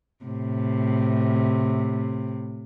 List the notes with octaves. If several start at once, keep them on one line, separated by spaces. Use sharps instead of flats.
A2 C3